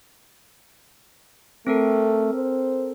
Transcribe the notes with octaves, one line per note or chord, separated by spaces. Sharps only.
A3 C4 A4 A#4
C5